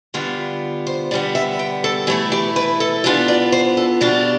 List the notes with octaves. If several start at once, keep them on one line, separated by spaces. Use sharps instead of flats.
D3 G3 B3 D4 F4
C5
D3 G3 B3 D5
E5
G5
A4
E3 A3 E4 G4
G4
B4
A4
E3 B3 D4 F4 G4
D5
C5
A4
B2 G3 D4 F4 G4